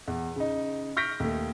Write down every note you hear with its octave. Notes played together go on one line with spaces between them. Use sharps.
E2
C#3 D#4
C#6 F6 G6 A#6 B6 D7
D#2 A3